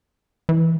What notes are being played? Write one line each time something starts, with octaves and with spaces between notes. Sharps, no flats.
E3